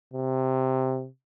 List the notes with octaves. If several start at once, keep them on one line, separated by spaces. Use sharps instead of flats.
C3